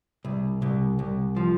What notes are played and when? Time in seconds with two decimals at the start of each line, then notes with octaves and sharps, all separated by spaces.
0.25 C2
0.62 C2
0.99 C2
1.37 F3